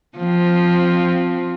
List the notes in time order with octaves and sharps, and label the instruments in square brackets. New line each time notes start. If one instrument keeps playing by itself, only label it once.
[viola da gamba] F3 C4